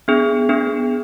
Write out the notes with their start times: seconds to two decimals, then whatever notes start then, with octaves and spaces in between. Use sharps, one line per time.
0.08 B3 D4 G#4
0.49 B3 D4 G#4